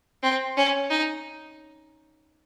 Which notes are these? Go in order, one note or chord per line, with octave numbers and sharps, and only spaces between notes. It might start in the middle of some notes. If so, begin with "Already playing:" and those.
C4
C#4
D#4